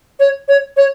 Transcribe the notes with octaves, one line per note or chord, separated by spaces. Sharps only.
C#5
C#5
C#5